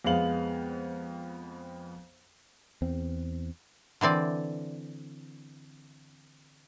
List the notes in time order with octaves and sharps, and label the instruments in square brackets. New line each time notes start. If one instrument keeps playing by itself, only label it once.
[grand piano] F2 G#3 B3 F5 F#7
[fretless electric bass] E2 C4
[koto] D3 E3 C4 D5